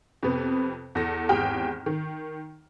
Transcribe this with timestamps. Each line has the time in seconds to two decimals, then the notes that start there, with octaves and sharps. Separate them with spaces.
0.23 F2 C3 B3
0.95 E2 A4 A#6
1.29 G#1 E2 G4 G#4 G5 F6
1.86 D#3